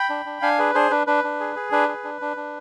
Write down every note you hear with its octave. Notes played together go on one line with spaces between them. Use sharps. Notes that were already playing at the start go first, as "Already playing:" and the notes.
Already playing: G5 B5
D4
D4
D4 F5 G#5
G#4 B4
D4 G#4 C5
D4 B4
D4 B4
D4
G#4
G#4
D4 B4
G#4
D4
D4
D4